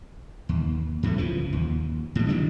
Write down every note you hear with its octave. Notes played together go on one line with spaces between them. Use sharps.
D#2
F#2 A2 G3 A3
C#2 C#3 E3 F3
D#2
A2 G3
D#3 E3 F#3 D4